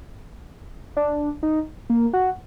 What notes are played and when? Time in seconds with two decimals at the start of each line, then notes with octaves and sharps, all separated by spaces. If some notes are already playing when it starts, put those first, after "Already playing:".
0.97 D4
1.43 D#4
1.90 A#3
2.13 F#4